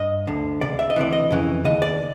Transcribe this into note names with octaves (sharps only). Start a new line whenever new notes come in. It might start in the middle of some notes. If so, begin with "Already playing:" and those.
Already playing: G2 D#5
D2 D3
C#2 C3 D5
E5
D#5
D2 C3 E3 D5
D#5
F2 C#3 E3
D#2 C#3 D#5
D5